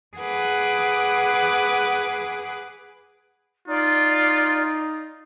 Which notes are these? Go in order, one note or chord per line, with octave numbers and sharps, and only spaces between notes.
G#4 B4 F#5 D6
D#4 F4 D5